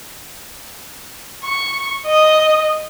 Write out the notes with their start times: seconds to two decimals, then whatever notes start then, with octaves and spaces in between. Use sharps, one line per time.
1.44 C#6
2.06 D#5